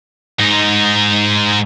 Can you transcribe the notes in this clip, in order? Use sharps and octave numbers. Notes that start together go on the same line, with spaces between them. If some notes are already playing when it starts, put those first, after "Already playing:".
G#2 D#4